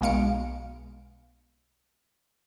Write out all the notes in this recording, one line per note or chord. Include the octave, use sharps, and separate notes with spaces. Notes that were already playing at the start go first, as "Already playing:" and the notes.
B1 B2 G#3 F5 C#7 D7